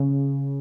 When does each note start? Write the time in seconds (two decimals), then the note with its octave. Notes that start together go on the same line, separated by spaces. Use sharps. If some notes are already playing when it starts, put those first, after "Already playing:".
Already playing: C#3